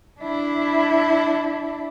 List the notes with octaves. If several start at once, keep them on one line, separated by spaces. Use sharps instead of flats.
D4 E4